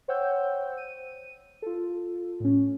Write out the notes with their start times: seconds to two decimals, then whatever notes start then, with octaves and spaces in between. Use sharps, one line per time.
0.08 C5 C#5 F#5 G5 E6 G6
0.77 D#7
1.62 F4 A4
2.40 A2 C#4